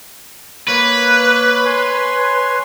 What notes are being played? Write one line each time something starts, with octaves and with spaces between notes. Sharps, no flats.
A#3 B4 C#5
C#5 G#5 C6